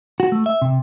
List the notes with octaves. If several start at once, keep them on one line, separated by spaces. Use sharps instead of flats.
F#4
A3
E5
C3